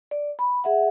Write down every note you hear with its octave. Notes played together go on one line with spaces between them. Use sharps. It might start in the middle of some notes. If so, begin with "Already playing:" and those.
D5
B5
G#4 E5 F#5